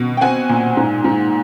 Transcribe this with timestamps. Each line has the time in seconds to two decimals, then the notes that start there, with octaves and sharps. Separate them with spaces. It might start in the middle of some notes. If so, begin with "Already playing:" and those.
Already playing: B2
0.17 G5
0.21 C4 F#5 G#5
0.49 A#2
0.77 G#2
1.04 G#2